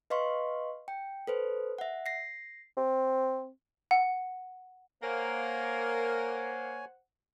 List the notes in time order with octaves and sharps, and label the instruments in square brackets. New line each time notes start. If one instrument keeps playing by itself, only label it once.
[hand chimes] B4 D#5 F5 C6 C#6
G5
A4 B4 C5
E5 F#5
A#6 C7
[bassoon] C4
[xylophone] F#5
[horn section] A#3 [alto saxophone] A#4 [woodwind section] C5 F#5 [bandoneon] C#5 G#5